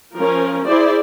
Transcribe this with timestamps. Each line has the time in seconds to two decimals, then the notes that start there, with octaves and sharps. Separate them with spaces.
0.16 F3 C#4 A#4
0.66 E4 G#4 C5 D5